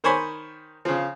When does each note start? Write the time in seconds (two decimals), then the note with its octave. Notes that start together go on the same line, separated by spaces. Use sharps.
0.04 D#3 C5 C#5 G#5 B5
0.85 C#3 F3